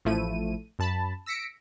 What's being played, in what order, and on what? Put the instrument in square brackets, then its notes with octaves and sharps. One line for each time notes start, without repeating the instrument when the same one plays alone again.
[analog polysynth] A1 F3 A3 E4 D#7
F#2 A5 B5
E6 A#6 B6 C#7 D7